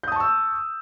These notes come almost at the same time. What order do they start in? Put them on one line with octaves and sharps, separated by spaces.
G6 D#6 A5 C#6 E6